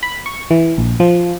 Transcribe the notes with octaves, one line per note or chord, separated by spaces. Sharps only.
B5
C#6
E3
A#1
F3